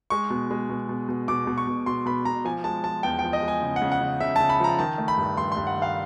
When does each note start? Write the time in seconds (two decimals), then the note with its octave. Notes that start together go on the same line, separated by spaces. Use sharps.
0.10 G#3 C#6
0.30 B2
0.51 G#3
0.70 B2
0.89 B2
1.09 B2
1.28 B2 D6
1.47 B2
1.58 C#6
1.67 B2
1.86 B2 C6
2.06 B2 B5
2.25 B2 A#5
2.45 F3 G#5
2.64 G#3 A5
2.84 F3 A5
3.03 E2 G5
3.19 G5
3.24 F3
3.33 D#5
3.43 G#3 G#5
3.62 C#3
3.76 F#5
3.82 C#3
3.92 F#5
4.01 C#3
4.20 C#3 E5
4.36 A5
4.40 C#3
4.49 B5
4.60 F3 A#5
4.79 D#3 A5
4.98 A3
5.08 B5
5.18 G2
5.37 G2 C6
5.52 C6
5.57 G2
5.67 F#5
5.76 D#3
5.82 F5